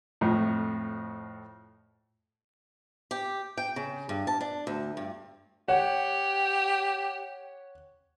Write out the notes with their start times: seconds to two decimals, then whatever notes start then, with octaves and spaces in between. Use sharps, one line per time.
0.21 F2 A2
3.11 G4
3.58 G5
3.76 C#3
4.09 G2
4.27 A5
4.41 D4
4.67 D2
4.97 G2
5.68 G4 C#5 F#5